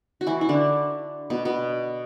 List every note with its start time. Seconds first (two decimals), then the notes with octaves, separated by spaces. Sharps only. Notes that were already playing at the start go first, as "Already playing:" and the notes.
0.21 F#4
0.27 E3 E4
0.41 E4
0.49 D3 D4
1.30 B2 B3
1.45 B2 B3